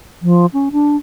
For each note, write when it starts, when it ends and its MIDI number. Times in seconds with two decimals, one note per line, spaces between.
0.22 0.46 53
0.53 0.69 61
0.72 0.96 62